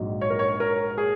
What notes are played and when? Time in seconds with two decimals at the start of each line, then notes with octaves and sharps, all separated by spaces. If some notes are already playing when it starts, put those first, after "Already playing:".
Already playing: A#1 G#2 F#3
0.21 C#5
0.30 A#4
0.39 C#5
0.60 A#4
0.98 G#4